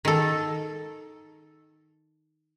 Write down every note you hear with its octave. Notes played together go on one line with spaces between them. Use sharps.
D#3 A4